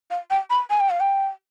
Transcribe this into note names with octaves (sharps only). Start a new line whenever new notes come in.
F5
G5
B5
G#5
G5
F5
G5